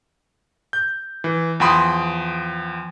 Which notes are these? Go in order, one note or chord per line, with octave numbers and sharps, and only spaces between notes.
G6
E3
E2 F3 G5 B5 C6 D#6